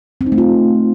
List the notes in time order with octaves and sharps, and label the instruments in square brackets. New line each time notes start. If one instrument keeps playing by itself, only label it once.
[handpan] C4
D#4
A3
F4